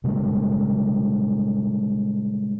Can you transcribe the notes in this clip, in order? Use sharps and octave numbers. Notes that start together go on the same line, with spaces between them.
A#2 C#3 G3 G#3